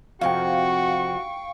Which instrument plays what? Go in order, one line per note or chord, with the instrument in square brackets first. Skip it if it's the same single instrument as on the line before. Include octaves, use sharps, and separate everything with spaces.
[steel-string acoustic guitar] F2 C3 [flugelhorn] F#4 [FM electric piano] F5 G5 [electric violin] C#6